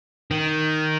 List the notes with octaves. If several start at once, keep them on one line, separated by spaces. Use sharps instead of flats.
D#3